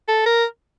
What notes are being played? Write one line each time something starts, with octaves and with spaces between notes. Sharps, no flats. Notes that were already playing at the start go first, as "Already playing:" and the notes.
A4
A#4